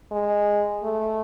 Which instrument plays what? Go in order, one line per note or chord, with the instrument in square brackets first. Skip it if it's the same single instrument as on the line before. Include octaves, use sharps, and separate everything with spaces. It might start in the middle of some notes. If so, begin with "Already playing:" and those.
[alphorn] G#3
A3